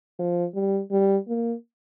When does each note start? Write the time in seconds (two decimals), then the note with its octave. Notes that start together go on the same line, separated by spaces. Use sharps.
0.19 F3
0.55 G3
0.92 G3
1.28 A#3